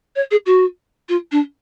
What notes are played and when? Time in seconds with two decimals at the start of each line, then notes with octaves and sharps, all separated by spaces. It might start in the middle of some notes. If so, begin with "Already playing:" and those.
0.15 C#5
0.31 G#4
0.46 F#4
1.09 F4
1.31 D4